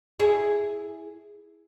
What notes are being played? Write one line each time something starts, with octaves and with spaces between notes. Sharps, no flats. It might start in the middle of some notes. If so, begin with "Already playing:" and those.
E4 G#4